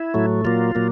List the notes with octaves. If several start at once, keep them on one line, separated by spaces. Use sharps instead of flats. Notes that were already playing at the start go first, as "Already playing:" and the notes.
Already playing: E4
A2 F#3 A3
A#2 F#3 A#3 F4
A#2 F#3 A#3